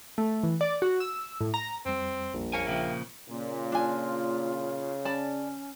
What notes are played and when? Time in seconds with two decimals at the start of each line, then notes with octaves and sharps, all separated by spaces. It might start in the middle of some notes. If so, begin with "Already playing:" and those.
0.18 A3
0.43 E3
0.61 D5
0.82 F#4
1.00 E6
1.41 A2
1.54 A#5
1.86 F2 G3 C4
2.34 A#1
2.53 A#3 C#5 G#5
2.67 A#2 C#3 F3 E5 G5
3.29 A#2 C#3
3.72 D4 F4 G#5
5.05 C#4 D5 A5 B5